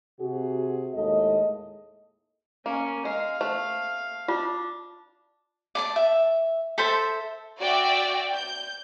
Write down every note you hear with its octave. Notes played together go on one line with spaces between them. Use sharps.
C3 F#4 G#4
D#2 A2 G#3 A4 D#5
A#3 C#4
G#3 F5
A3 C5
D4 F4
D5 A5 D6
E5
A4 C5 E5 A5
F#4 D5 E5 G5
G6